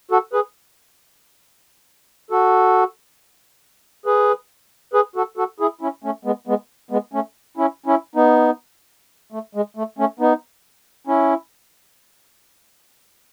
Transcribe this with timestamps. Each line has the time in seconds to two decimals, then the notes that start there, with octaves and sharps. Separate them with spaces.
0.11 F#4 A4
0.33 G#4 B4
2.30 F#4 A4
4.06 G#4 B4
4.93 G#4 B4
5.16 F#4 A4
5.37 F#4 A4
5.60 E4 G#4
5.81 C#4 E4
6.04 A3 C#4
6.25 G#3 B3
6.47 G#3 B3
6.91 G#3 B3
7.13 A3 C#4
7.57 C#4 E4
7.86 C#4 E4
8.15 B3 D#4
9.32 A3
9.55 G#3
9.77 A3
9.98 A3 C#4
10.19 B3 D#4
11.07 C#4 E4